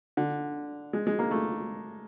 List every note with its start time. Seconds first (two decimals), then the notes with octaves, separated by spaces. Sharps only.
0.17 D3
0.93 G#3
1.07 G#3
1.19 A#3
1.31 A3